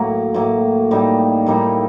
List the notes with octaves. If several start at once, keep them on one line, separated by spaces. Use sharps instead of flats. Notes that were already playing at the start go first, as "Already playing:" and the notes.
Already playing: A2 F#3 A#3
A2 F#3 A#3
A2 G3 A#3 D#4
A2 G3 A#3 D#4